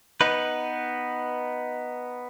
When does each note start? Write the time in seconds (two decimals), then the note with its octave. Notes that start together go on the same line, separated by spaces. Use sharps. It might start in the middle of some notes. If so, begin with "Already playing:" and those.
0.21 B3 D#4 B4